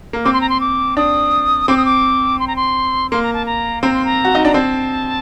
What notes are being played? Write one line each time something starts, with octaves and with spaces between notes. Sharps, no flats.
A#3
C4 D6
C6
A#5
C6
D6
D4 D#6
C4 D6
D#6
D6
C6
A#5
C6
A#3 C6
A#5
A5
A#5
C4 A#5
C6
A#5
F#4
D#4
D4 A#5
C4 A5